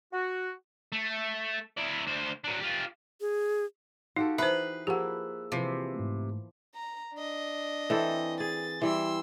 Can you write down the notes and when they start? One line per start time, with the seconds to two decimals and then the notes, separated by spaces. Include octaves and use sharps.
0.13 F#4
0.92 A3
1.78 E4 D5
2.07 D2 C5
2.44 F#3 D4
2.61 F4 G4
3.21 G#4
4.16 D#4 F#4 G4 A4 F5
4.38 E3 D#4 B4 C5 E5 C7
4.87 F3 A#3 E4 G4 G#4 F#5 E6
5.52 C3 E3 F3
5.95 G#2 A3
6.75 A#5
7.14 D4 D#5
7.90 E3 C4 A4
8.40 G#4 A6
8.82 E3 G3 C6 E6